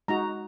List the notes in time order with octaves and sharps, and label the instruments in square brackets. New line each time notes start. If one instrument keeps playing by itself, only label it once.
[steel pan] G#3 D#4 F#4 A#5